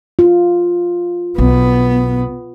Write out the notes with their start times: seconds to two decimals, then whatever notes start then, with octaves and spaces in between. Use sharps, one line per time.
0.19 F4
1.38 B1 B3